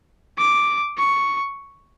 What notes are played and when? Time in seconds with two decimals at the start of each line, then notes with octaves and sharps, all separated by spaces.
0.38 D6
0.98 C#6